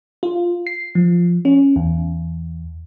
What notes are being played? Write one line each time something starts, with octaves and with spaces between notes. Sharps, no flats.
F4
C7
F3
C#4
E2